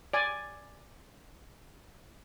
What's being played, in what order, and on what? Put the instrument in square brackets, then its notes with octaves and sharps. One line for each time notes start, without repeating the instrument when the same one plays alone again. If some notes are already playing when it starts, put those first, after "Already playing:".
[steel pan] D5 G#5